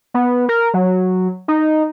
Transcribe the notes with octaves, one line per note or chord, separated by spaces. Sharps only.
B3
A#4
F#3
D#4